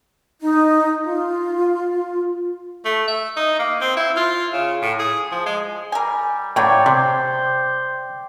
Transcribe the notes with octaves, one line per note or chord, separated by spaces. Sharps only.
D#4
F4
A3
E5
D#4
A#3
C4
E4
F4
C#3
A2
G#4
F3
G#3
G3 A#4 G#5
A2 C#3 F#3 A#3 C#5 D5 G5
C3 G3 C5